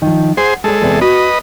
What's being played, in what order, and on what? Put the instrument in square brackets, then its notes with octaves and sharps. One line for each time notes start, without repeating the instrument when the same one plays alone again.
[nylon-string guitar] D#3 F3
[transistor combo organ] G#4 C5 [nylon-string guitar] F#5
[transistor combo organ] G#3 A4 [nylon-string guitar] C#5 A5
[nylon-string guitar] E2 C3
[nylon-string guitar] F#4 [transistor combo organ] B4 D#5